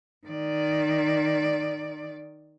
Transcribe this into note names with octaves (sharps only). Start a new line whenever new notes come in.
D#3 D5